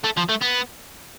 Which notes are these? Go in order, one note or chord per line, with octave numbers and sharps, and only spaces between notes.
A3
F3
A3
B3